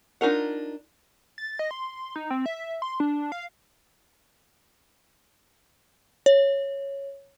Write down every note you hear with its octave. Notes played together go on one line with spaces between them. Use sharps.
D4 D#4 F4 A#4 F#5
A6
D#5
C6
D#4
C4
E5
C6
D4
F5
C#5